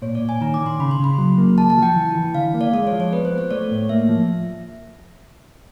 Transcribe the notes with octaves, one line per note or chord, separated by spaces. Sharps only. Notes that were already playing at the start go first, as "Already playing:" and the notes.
A#2 C#5
D5
A#2
G#5
D#3 A#5
D6
D#3
C6
C#3 B5
C6
C#3 B5
F#3
A#3
C#2 A5
A5
F3
G5
E3
E3
D3 F5
A#3
D5
G#3 D5
C#5
F3
C#5
B3 B4
C5
B3
C#5
A3 D5
A2
A#3 E5
F3